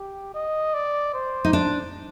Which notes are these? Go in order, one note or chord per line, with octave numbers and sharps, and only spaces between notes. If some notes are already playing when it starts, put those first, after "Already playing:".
Already playing: G4
D#5
D5
C5
D#4
D4